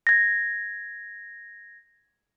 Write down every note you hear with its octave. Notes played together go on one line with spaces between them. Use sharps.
G#6 A#6